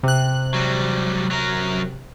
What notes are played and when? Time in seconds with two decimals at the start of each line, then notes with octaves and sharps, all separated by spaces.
0.03 C3 F#6
0.54 F#3 G3
1.31 F#3 A#4